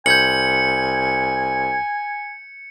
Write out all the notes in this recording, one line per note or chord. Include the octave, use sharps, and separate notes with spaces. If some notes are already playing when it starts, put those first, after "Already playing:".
C2 G#5 G6 G#6 C#7 F#7